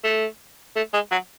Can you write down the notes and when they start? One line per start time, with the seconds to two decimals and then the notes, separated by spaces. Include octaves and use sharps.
0.04 A3
0.76 A3
0.93 G#3
1.11 F#3